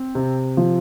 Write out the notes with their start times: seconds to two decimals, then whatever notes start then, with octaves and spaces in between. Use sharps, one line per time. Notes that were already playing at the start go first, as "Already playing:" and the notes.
Already playing: C4
0.15 C3
0.57 F3